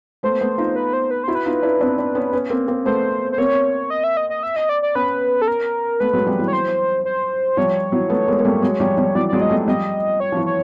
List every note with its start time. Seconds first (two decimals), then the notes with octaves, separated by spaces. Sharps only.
0.23 A3 B3 C5
0.41 A3 B3
0.58 D#4 F4
0.76 B4
0.93 C5
1.11 B4
1.24 E4 F#4 C5
1.35 B4
1.46 D#4 F4
1.63 D4 E4
1.81 C4 D4
1.98 C4 D4
2.15 B3 C#4
2.33 B3 C#4
2.50 A#3 C4
2.68 A#3 C4
2.86 A3 B3 C5
3.32 C5
3.38 A#3 C4 C#5
3.90 D#5
4.04 E5
4.17 D#5
4.30 D#5
4.43 E5
4.56 D#5
4.69 D5
4.82 D5
4.95 B3 C#4 B4
5.42 A4
5.48 A#4
6.00 A3 B3 B4
6.13 F#3 G#3
6.26 F3 G3
6.39 E3 F#3
6.48 C#5
6.53 C5
7.05 C5
7.57 F3 G3 C#5
7.92 E3 F#3
8.10 A3 B3
8.28 G#3 A#3
8.39 A#3
8.45 G3 A3
8.62 F#3 G#3
8.80 F3 G3
8.97 F3 G3
9.15 E3 F#3 D5
9.28 F#3 G#3 D5
9.42 D#5
9.49 G3 A3
9.67 F3 G3 D#5
10.20 C#5
10.32 F3
10.37 E3
10.46 C#5